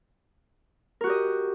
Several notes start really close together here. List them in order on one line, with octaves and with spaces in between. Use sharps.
A#4 F#4 G4 D#5